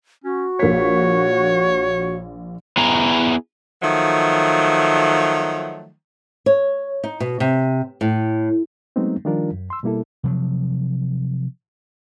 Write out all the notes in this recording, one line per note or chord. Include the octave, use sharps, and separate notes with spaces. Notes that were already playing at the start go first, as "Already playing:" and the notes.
C#4 F#4
A#1 A#4 C#5 B6
B3 E4 G#4 A#5
D#3 F3 F#3 A3
C#5
D#4
B2
C3
A2
F#3 G#3 A3 B3 C4 D#4
D#3 F3 G3 D4 F4 A#4
F#2
C6 E6
B2 G3 A#3 E4 A4
C3 F3 F#3